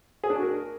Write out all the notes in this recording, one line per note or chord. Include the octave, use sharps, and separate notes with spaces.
G#4
D4
F#4
A#4